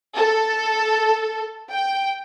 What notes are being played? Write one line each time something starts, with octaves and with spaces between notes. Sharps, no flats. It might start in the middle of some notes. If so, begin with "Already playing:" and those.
A4
G5